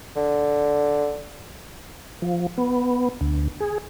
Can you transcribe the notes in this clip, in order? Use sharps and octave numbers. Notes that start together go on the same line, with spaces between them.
D3
F3
B3
D2
G#4